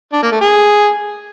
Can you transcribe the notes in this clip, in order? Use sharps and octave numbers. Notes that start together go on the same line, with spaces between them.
D4
A#3
A3
G#4